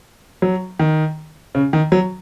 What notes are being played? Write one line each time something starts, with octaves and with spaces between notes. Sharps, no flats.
F#3
D#3
C#3
D#3
F#3